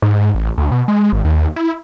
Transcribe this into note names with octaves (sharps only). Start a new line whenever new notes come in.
G#2
A1
D2
B2
G#3
G#1
D#2
E4